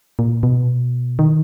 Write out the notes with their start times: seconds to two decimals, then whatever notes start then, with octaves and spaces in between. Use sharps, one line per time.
0.19 A#2
0.43 B2
1.19 D#3